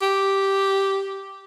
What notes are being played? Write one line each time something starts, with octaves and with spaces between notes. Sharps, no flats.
G4